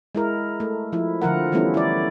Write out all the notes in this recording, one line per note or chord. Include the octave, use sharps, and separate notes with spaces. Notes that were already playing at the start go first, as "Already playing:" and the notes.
G#3 E4 A#4
A3
F3 E4
D3 F3 F4 A#4 F#5
E3 G3 A3 B3 C#4 E4
E4 D5